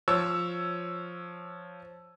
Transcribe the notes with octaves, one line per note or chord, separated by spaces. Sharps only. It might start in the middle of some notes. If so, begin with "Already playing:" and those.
F3 C#5 E6